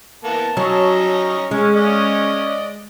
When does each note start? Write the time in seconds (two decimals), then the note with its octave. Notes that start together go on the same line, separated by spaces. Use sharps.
0.24 E3 A#3 B3 A5
0.57 F#3 C#4 D#5 A#5
1.51 G#3 C#4
1.75 D5 D#5